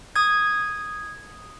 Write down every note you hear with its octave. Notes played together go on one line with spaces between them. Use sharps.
D#6 G#6